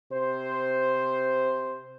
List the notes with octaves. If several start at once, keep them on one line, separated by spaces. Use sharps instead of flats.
C3 C5